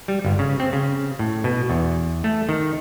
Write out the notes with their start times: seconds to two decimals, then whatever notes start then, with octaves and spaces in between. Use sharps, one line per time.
0.08 G3
0.25 G1
0.39 C#3
0.60 C4
0.73 C#3
1.19 A2
1.44 B2
1.70 E2
2.24 A3
2.49 D#3